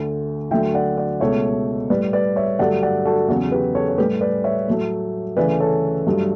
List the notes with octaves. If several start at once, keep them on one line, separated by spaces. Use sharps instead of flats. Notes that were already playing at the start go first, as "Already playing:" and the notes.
Already playing: D2 D3 A3
D2 D3 F#3 E5 G5
D5 F#5
D5 F#5
C#2 B2 A3 C#5 E5
A2 G3 B4 D5
B4 D5
C#5 E5
G2 D3 F#3 A3 D5 F#5
D5 F#5
F#4 A4
E2 C#3 F#3 F#4 A4
G4 B4
A4 C#5
C#5
A2 G3 G4 B4
B4 D5
C#5 E5
A2 F#3 A3
D2 C#3 E3 A3 B4 D5
A4 C#5
G2 F#3 A3